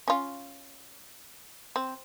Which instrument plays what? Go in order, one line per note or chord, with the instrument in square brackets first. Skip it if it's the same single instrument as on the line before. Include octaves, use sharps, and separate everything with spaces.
[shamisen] C#4 F4
C4